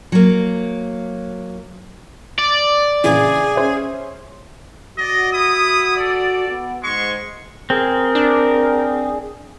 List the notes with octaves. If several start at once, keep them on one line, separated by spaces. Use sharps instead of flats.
F#3 A#3
D5
A#1 C#3 E3 G#4
C#4 C5 E5
F#4 D5 D#5
E4 D#6
A4 D5
B3
G#2 G#3 C6 C#6
C4 G#4 A#4
D4